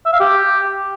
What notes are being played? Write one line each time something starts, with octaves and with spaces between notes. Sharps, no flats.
E5
F5
G4